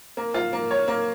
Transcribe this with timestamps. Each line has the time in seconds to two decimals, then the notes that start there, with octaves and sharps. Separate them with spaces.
0.17 A#3
0.34 F4
0.53 A#3
0.71 C#5
0.88 A#3